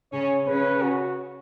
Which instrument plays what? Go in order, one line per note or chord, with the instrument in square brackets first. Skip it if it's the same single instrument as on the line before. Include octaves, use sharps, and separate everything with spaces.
[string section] C#3 C#4 [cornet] C#5
[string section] C#3 C#4 [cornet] B4
[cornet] F#4